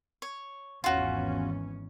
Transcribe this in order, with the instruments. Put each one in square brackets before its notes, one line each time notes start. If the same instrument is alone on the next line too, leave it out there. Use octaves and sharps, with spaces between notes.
[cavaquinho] C#5
[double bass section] G#1 E2 C#4 [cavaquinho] F4 F#4